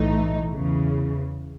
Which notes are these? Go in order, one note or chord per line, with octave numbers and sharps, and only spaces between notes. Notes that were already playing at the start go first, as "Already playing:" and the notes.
Already playing: B1 A2 E3 A3 D#4
E2 C#3 E3